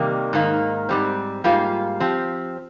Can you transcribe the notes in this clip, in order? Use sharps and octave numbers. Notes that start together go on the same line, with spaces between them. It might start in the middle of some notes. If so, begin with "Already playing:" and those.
Already playing: C3 D#3 G3 A#3
G#2 D#3 A#3
G#2 G3 C4
G#2 G3 A#3 F4
F3 C4 G4